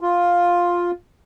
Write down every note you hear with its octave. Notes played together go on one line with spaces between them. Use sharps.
F4